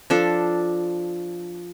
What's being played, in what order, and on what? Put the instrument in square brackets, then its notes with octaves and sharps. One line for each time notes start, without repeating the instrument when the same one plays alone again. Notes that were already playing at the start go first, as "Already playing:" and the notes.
[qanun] F3 D4 A4